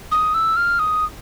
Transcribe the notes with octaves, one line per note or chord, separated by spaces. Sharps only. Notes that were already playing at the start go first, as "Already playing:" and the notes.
D#6
E6
F6
D#6